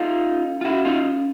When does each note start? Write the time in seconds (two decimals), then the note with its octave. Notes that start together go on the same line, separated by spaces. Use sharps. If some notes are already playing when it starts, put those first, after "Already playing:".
Already playing: D#4 F4 A4
0.27 C#4
0.61 F4
0.65 C#4 E4 F#4
0.85 D#4 F4
1.05 C#4